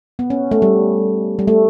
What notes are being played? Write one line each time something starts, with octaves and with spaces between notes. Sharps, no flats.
B3
C#4
A3
G3
G3
A3